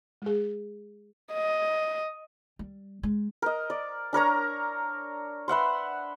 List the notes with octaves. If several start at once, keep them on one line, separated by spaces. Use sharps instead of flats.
G#3 G#4
D#5
G3
G#3
A#4 D#5
D5
D4 A#4 C#5 A#5
B4 E5 F#5 C6